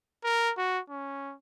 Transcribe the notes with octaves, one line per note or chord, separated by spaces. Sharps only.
A#4
F#4
C#4